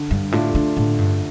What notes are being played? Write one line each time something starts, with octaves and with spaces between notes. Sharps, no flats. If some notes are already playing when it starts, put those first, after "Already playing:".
Already playing: D3
G2
A2 A3 D4 F4
D3
A2 D3
G2